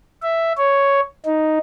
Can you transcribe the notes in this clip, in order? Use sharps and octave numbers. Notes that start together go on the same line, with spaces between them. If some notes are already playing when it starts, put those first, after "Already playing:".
E5
C#5
D#4